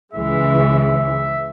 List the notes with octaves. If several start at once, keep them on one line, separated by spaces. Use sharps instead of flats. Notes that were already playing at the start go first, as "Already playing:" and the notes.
C#2 C#3 E3 G#3 E5
E5